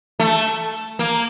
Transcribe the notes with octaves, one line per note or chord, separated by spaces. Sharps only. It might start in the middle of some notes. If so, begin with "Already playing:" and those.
A3
A#3